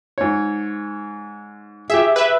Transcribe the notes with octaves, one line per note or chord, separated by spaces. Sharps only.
G#2 C#5
G4 G#4 E5
B4 E5